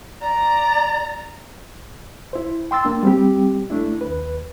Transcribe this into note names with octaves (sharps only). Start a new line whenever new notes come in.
D5 A#5
E4 C5
G5 C6 E6 A6
A#3 D4
G3 C4 G4
A3 D4 E4
D#2 B4